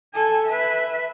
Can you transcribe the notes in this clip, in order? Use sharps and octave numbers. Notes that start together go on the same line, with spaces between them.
A4 G#5
B4 E5